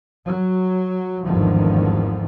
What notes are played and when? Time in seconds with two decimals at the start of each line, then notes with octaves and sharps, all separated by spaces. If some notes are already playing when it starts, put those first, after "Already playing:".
0.25 F#3
1.23 G#1 E2 G2 D3 D#3 F3